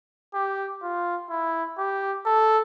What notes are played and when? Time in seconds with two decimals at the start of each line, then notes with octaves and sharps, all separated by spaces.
0.34 G4
0.82 F4
1.30 E4
1.78 G4
2.26 A4